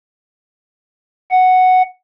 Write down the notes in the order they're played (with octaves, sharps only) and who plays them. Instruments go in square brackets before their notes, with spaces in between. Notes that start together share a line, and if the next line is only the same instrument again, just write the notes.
[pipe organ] F#5